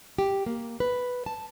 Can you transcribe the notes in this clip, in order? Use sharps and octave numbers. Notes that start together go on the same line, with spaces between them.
G4
A#3
B4
A5